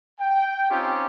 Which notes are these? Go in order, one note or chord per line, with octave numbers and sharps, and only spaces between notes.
G5
C4 C#4 D#4 F4 G4